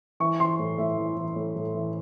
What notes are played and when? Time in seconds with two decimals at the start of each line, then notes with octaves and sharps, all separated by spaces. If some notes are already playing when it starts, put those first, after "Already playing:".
0.20 E3 C#6
0.40 E3 C6
0.59 A2
0.78 A2 E5
0.98 E3
1.17 E3
1.36 A2
1.56 A2
1.75 E3